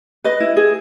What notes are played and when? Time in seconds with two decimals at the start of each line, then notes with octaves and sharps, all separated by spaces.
0.24 B4 D#5
0.40 E4
0.57 G#4